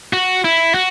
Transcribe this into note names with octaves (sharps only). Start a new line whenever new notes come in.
F#4
E4
F#4